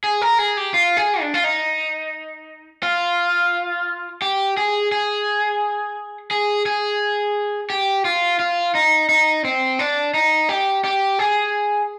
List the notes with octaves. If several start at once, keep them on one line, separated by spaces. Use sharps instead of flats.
G#4
A#4
G#4
G4
F4
G#4
D4
F4
D#4
F4
G4
G#4
G#4
G#4
G#4
G4
F4
F4
D#4
D#4
C4
D4
D#4
G4
G4
G#4